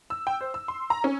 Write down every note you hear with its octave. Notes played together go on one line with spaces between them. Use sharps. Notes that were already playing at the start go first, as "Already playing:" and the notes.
E6
G5
C5
E6
C6
A#5
C#4